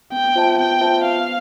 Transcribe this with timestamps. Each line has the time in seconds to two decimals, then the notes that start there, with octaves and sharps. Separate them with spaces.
0.12 B3 G5
0.35 F4 C5 E5 A5
0.58 B3 G5
0.81 F4 C5 E5 A5
1.04 B3 F5